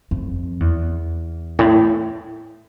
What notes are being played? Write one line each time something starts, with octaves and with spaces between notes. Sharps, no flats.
F2
E2
A2